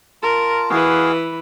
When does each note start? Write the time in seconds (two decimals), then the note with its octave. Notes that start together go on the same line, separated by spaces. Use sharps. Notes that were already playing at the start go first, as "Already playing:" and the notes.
0.23 F4 A#4 A5 A#5
0.70 E3 F#4 G#4 B4 F5